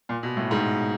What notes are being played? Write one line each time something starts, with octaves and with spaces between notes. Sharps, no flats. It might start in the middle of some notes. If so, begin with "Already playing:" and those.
A#2
B2
A2
G#2